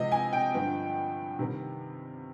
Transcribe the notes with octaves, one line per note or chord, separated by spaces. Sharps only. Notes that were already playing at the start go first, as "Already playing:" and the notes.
Already playing: C3 F3 G#3 B3 D#5
G#5
G5
G2 D3 F3 B3
C3 D#3 G3 B3